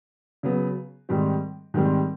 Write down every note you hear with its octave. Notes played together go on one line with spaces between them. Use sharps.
C#3 F#3 B3
G#2 D#3 G3 C4
G#2 D#3 G3 C4